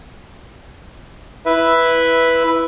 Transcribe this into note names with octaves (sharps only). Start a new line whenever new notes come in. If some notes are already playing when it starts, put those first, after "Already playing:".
E4 B4 E5